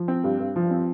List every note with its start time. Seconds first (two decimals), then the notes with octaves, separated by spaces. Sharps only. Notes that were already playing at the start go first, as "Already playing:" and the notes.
Already playing: F3
0.08 C4
0.24 G2
0.40 G2
0.56 F3
0.71 C4